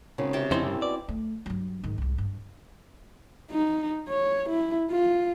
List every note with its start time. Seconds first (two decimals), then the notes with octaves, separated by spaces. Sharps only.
0.18 G#1 C#3
0.33 C3 G5 A5
0.51 D1 F2 C4 C#4 D#4 E4 C5
0.63 C2 G2 C3
0.82 B2 D5
1.09 A3
1.46 G2 F#3
1.84 G#2 D#3
1.98 C2 G#2
2.18 G2
3.51 D#4
4.08 C#5
4.49 E4
4.91 F4